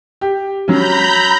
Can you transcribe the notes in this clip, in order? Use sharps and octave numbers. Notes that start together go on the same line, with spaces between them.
G4
F#3 C#4 A#5 B5 G6